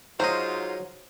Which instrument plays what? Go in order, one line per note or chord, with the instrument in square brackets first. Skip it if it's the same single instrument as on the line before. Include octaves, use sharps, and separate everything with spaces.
[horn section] G#2 F4 [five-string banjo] F#3 [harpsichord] C5 D#5